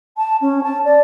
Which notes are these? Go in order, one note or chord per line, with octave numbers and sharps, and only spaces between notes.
A5
C#4
A5
D5